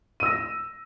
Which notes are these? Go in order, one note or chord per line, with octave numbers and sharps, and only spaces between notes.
E6 A#6 D#7